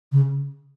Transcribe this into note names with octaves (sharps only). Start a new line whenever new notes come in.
C#3